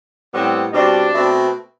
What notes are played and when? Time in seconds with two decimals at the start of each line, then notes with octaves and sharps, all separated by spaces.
0.32 A2 G3 B3 C4
0.73 B2 G3 C4 D4
1.13 B2 A3 C4